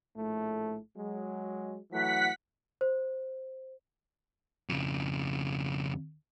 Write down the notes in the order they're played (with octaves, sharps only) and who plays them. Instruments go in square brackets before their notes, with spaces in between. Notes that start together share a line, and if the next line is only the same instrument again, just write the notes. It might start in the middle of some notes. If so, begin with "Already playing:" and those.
[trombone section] A#1 A2 A3
F#3 G#3
[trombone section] E3 F#3 A3 [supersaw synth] F#5 B6
[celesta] C5
[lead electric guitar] F2 C#3